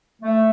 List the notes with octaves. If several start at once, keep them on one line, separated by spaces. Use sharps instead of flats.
A3